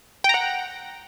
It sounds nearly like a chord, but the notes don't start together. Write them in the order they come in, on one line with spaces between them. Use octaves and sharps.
G5 A#5 F#5